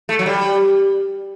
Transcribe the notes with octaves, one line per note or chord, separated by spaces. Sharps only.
A3
F#3
G3